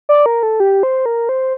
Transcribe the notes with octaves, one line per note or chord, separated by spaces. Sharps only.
D5
A#4
A4
G4
C5
A#4
C5